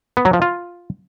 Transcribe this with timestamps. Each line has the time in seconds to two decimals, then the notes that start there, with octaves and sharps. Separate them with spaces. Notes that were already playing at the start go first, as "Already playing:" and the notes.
0.17 B3
0.25 F#3
0.33 F3
0.42 F4